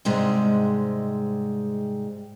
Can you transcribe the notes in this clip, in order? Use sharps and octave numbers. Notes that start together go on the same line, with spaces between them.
G#2 C3 G3 G#3